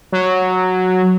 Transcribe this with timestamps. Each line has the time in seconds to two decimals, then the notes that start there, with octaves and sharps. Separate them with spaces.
0.12 F#3